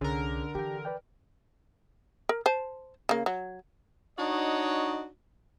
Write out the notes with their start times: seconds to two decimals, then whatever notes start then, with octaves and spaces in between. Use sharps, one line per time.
0.01 C2 D3 C#4 G#4 A#4
0.55 E3 G4 G5
0.85 B4 D5 G5
2.29 A#4
2.46 C5 A5
3.09 C#3 A#3
3.26 F#3
4.18 D4 D#4 F#4 C#5 D#5